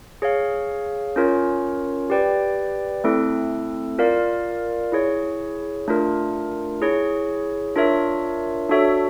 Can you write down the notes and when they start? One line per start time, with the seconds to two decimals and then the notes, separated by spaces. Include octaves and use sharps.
0.22 G#4 C#5 F5
1.16 C#4 F4 A#4 C#5
2.10 G4 B4 D5 G5
3.04 A3 C4 E4 A4
3.98 F4 A#4 D5 F5
4.92 E4 G#4 C#5
5.88 A3 D4 F4 A#4
6.82 E4 G#4 C#5
7.76 D4 F4 A#4 C#5 E5
8.69 D4 F#4 A4 C#5 E5